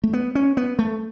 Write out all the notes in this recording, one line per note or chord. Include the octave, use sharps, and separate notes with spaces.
A3
B3
C#4
B3
A3